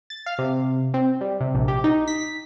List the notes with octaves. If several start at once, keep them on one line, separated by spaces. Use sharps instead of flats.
A6
F5
C3
C4
G3
C3
A#1
G4
D#4
B6